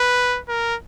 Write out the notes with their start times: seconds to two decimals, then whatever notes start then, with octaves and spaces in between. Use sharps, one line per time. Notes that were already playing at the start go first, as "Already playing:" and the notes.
Already playing: B4
0.48 A#4